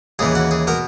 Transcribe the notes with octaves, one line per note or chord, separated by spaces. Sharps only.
D#2 C#3 E3 G#4
F#4
G#4
B2 A#4